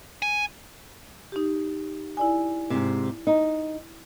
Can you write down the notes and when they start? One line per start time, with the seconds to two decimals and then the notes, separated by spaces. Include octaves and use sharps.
0.22 G#5
1.32 D#4 G4
2.17 E4 D5 G#5
2.70 G#2 C3
3.27 D#4